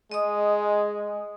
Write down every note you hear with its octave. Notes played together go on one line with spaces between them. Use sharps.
G#3 D#5 D#6